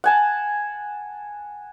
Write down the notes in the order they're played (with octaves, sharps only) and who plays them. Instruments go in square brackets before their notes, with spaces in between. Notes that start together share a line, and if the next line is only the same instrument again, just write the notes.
[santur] F#5 G#5 A5